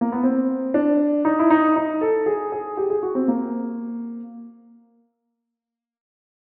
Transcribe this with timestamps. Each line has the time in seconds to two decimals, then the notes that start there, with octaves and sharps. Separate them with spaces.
0.01 A#3
0.12 B3
0.23 C4
0.74 D4
1.25 D#4
1.39 E4
1.50 D#4
1.76 D#4
2.01 A4
2.26 G#4
2.52 G#4
2.77 G4
2.90 G#4
3.03 F#4
3.15 C4
3.28 A#3